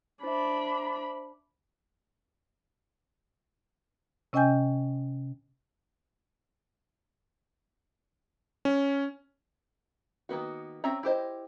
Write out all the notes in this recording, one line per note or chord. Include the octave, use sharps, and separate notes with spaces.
D4 C5 E5 B5
C3 C#4 D#5 G5 G#5 G6
C#4
D#3 A#3 B3 F#4
C4 C#4 E5 A#5
E4 G4 C5 D#5